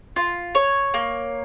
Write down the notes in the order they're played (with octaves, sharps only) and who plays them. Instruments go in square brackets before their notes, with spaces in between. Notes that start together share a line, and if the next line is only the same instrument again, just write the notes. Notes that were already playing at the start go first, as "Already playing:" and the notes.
[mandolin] F4
C#5
A#3